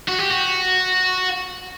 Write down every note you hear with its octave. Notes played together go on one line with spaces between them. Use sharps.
F#4
G4
F#4